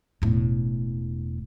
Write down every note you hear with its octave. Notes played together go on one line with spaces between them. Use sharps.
E1 A2